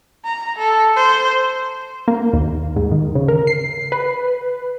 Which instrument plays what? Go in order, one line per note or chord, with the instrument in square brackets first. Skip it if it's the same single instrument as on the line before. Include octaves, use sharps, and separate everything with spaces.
[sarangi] A#5
A4
C5
[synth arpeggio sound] A#3
D#2
G#2
D#3
C#3
A#4
C7
B4